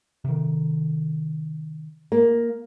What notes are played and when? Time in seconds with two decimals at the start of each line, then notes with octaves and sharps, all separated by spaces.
0.25 C3 D#3
2.12 A#3